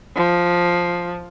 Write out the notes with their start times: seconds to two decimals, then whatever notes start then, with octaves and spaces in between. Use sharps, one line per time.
0.16 F3